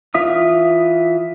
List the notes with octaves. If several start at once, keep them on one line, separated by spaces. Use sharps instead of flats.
E3 F4 E5 D#6